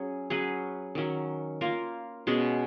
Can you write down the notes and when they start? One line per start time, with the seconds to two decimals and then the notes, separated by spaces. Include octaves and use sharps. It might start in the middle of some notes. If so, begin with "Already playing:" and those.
Already playing: F#3 C#4 G#4
0.30 F#3 C#4 G#4 B4
0.95 D#3 F#3 C#4
1.61 A#3 F4 A#4
2.27 B2 G#3 C#4 G#4